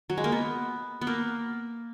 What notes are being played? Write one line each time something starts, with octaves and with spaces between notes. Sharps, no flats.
F#3
G#3
A#3
B3
B3
A#3